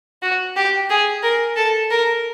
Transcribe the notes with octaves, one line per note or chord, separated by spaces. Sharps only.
F#4
G4
G#4
A#4
A4
A#4